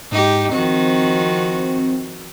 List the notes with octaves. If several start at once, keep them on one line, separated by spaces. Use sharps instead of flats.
G#2 D#4 G4
D#3 F3 C4 F#4